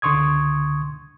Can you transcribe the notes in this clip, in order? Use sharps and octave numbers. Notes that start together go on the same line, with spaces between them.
C#2 D3 C6 C#6 D#6 G#6